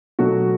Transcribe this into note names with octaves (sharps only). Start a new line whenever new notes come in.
B2 F#3 A3 F#4